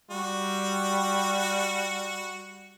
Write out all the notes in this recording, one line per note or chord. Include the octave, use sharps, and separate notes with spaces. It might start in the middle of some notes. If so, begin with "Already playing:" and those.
G3 F#4